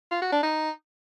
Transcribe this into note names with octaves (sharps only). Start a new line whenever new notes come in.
F4
F#4
D4
D#4